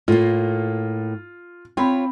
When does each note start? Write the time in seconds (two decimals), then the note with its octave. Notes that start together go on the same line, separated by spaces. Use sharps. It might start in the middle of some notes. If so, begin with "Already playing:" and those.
0.08 A2 A#3 F4
1.77 C4 F4 C#5 B5